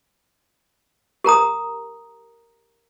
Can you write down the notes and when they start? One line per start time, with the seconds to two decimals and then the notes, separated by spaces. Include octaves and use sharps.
1.24 G4 A#4 A#5 D#6